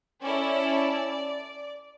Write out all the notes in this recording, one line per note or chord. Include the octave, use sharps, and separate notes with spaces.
C#4 E4 A4 D5